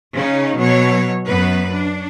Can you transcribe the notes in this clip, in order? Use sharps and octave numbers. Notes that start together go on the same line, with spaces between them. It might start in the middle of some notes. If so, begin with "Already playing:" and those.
C#3 C#4 D#4
B2 F#3 C#5
F#2 B3 B4
D4